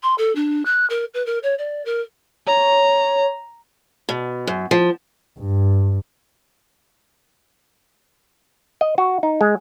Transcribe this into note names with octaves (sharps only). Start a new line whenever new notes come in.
C6
A4
D4
F#6
A#4
B4
A#4
C#5
D5
A#4
C#5 A#5
B2
F#2
F3
G2
D#5
F#4
D#4
G#3